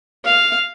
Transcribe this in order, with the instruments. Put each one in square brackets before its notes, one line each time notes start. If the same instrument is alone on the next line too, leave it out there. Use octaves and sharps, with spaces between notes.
[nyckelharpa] F5